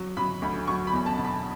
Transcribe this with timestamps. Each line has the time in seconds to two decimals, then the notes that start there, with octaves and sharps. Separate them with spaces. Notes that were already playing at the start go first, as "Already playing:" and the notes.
Already playing: F#3
0.17 F#3 B5
0.42 D2 B5
0.67 F#3 C#6
0.87 B5
0.93 E2
1.06 A5
1.18 B2
1.24 B5